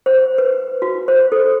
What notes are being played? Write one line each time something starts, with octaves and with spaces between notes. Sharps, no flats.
C5
B4
F#4
C5
A4